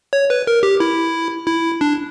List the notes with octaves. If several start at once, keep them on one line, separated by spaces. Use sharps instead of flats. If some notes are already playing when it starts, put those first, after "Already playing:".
C#5
B4
A#4
G4
E4
E4
D4